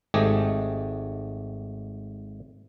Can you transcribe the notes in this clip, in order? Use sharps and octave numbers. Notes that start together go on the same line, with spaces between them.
G#1 G#2 A3 G4 D#5 G#5